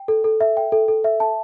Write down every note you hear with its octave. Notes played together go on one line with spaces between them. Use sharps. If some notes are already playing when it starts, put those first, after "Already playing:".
Already playing: G5
A4
A4
E5
G5
A4
A4
E5
A5